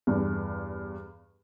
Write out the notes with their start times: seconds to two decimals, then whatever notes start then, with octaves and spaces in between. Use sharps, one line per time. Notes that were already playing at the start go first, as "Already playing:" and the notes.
0.07 E2 G2